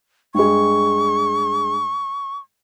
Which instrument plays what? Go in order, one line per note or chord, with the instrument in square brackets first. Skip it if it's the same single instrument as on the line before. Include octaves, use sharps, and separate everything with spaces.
[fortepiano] G2 G#3 [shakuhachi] C#6